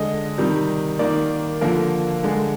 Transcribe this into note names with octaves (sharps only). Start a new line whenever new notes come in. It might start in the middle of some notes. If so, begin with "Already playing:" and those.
Already playing: D3 G#3 D#5
C3 D#3 G3
D#3 A#3 D5
D3 F3 A#3 A#4
D3 G#3